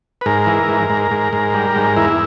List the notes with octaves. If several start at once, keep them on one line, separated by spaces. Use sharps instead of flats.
B4
G#2 A#4
E3
G#2
G#2
G#2
G#2
G3
G#2
E2 E4